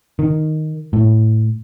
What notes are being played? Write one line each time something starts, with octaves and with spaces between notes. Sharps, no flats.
D#3
A2